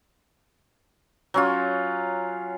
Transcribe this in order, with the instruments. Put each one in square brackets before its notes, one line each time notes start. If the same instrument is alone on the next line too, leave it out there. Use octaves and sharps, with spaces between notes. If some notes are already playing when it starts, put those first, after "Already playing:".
[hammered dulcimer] F#3 C#4 F4